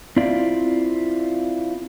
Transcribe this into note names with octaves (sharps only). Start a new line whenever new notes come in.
C4 E4 F4 D5